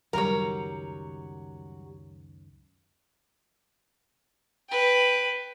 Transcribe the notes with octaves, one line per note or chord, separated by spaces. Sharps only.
C#2 F#2 D#3 F#3 G3 A#4 C#5 A#5
B4 G5